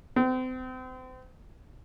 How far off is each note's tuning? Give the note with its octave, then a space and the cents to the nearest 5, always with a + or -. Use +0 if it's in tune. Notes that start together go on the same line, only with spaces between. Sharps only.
C4 -35